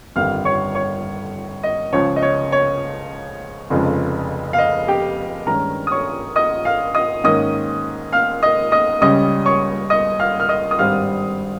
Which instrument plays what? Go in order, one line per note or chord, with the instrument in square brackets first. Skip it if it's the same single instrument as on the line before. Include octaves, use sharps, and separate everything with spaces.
[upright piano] G1 F2 D#3 G3 F5 F6
C#5 C#6
C#5 C#6
D#5
C#2 C#3 F3 C#5
D#5
C#5
C#5
F1 F2 C#3 F3 G#3
F5
D#5
G4 G5
G2 D#3 G#3 C#4 A#4 A#5
D#6
C#5 C#6
D#5 D#6
F5 F6
D#5 D#6
G#2 D#3 A#3 C#4 D#5 D#6
F5 F6
D#5 D#6
D#5 D#6
C#2 C#3 G3 C#4 D#5 D#6
C#5 C#6
D#5 D#6
F5 F6
F6
D#5 D#6
D#6
G#1 G2 G3 C4 F5 F6